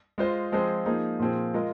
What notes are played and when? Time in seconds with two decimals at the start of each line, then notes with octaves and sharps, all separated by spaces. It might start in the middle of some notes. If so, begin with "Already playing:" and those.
0.18 G#3 F4 C5 D#5
0.52 F3 G#3 C4 G#4 C5
0.86 F3 A#3 D#4 G#4
1.20 A#2 F3 C4 G#4
1.54 G#3 F4 A#4 D#5